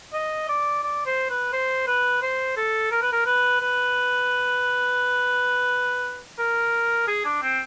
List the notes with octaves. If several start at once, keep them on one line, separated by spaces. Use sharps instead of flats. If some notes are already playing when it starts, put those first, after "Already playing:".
D#5
D5
D5
C5
B4
C5
B4
C5
A4
A#4
B4
A#4
B4
B4
A#4
G#4
D4
C4